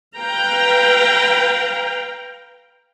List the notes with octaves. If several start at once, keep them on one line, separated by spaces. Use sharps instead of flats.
B4 F5 G5 A#5